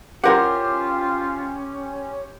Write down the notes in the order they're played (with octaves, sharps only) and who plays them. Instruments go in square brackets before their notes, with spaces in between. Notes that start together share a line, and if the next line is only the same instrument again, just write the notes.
[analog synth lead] C#4 [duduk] F4 [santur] G4 C5 C6 [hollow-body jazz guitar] A#4 F#5